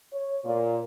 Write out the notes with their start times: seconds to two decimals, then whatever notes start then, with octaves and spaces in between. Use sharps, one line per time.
0.13 C#5
0.44 A#2